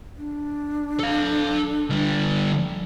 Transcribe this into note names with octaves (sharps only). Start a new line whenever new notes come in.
D4
A4 F5
D3 G3